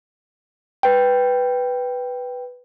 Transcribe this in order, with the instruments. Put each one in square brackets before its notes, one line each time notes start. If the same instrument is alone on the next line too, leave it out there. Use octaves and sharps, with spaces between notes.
[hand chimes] B4 G5